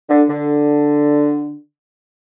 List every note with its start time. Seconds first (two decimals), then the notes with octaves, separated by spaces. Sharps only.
0.09 D3
0.29 D3